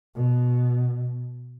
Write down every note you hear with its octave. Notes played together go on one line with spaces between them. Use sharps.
B2